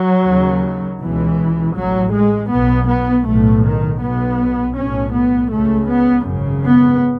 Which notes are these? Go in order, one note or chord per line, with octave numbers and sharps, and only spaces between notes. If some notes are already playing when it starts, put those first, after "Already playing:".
Already playing: F#3
D#2 C#3
C#2 B2 E3
A1 A2 F#3
G#3
B1 B2 B3
B3
B1 A2 A3
D#3
B1 B2 B3
B1 A2 C#4
B3
C#2 C#3 A3
B3
G#1 F#2 C#3
B3